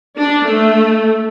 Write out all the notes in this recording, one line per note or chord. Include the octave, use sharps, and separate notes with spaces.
D4
A3